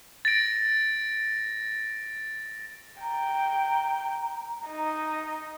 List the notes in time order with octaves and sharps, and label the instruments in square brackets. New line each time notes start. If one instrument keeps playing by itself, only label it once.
[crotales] A6 A#6 D7
[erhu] G5 [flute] A#5
[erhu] D#4